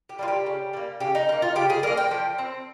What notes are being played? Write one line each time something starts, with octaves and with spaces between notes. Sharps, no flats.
G4
G3 A#3 F4
G4
C#3
G3 A#3
C#3 G4
D#4
G3 A#3 D#4
F4
C#3 G4
G#4
G3 A#3 A#4
G5
F3
C4